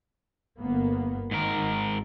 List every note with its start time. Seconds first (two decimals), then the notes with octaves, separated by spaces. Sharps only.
0.58 G1 A#3 B3
1.31 G#2 D#3 A#4
1.64 G#1